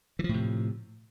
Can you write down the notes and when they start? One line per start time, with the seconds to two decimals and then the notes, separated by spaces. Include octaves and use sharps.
0.19 E3
0.24 F3
0.29 A2
0.34 C3